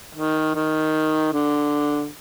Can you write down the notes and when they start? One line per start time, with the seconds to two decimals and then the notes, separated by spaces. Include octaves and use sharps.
0.15 D#3
0.55 D#3
1.33 D3